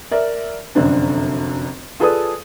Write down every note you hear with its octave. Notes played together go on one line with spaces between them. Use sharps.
A#4 D5 E5
F1 F#2 D3 C4 D4
F4 G#4 A4 B4 D5 D#6